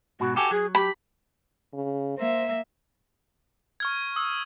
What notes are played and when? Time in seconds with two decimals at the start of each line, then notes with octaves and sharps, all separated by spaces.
0.20 G#2 B2 F#4
0.36 F#4 G4 A4 G#5
0.51 F#3 G#4
0.75 G4 B5
1.74 C#3
2.17 A#3 C5 E5
3.80 C#6 F6 G#6
4.16 D#6 E6